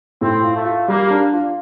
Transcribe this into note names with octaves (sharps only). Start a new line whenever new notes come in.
A2 C4
F4
A3
F4
G3 A#3
D4
F4